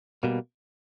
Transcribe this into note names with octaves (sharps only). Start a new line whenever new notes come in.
B2 G3 A#3